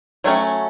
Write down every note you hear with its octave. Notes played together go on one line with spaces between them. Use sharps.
F#3 A3 C#4